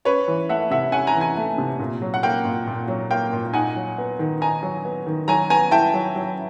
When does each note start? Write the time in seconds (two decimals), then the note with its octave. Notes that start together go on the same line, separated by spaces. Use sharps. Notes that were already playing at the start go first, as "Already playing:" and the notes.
0.05 C#4 B4 C#5
0.28 E3
0.49 A3 E5 F#5
0.71 C3 E5 F#5
0.92 C#4 F#5 G#5
1.07 G#5 A#5
1.15 E3
1.21 G#5 A#5
1.37 A3
1.58 C3
1.79 A#2
2.02 F#3
2.14 F#5
2.23 A#3 F5 G5
2.45 A#2
2.67 A#2
2.88 F#3
3.11 A#3 F5 G5
3.33 A#2
3.54 D#4 F#5 G#5
3.76 F#3
3.98 B3
4.19 D#3
4.41 D#4 G#5 A#5
4.63 F#3
4.85 B3
5.07 D#3
5.28 F#3 G#5 A#5
5.50 B3 G#5 A#5
5.71 E4 G5 A5
5.94 F#3
6.16 F#3